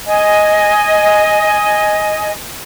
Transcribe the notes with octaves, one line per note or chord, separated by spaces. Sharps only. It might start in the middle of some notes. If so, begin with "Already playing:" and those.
D#5 G#5